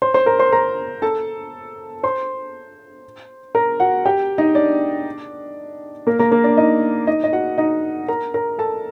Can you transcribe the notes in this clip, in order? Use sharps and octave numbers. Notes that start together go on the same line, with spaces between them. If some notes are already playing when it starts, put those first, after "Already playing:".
C5 C6
C5 C6
A#4 A#5
C5 C6
A#4 A#5
A4 A5
C5 C6
A#4 A#5
F#4 F#5
G4 G5
D#4 D#5
D4 D5
A#3 A#4
A#3 A#4
A#3 A#4
D4 D5
D#4 D#5
D#4 D#5
D#5
F#4 F#5
D#4 D#5
A#4 A#5
A#4 A#5
A4 A5